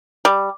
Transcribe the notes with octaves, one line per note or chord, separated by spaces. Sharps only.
G3